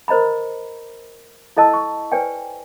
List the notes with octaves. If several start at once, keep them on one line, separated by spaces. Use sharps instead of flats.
A#4 C5 D#5 A#5 B5
E4 A4 D#5 A5 E6
C#6
B4 C5 D5 G5 G#5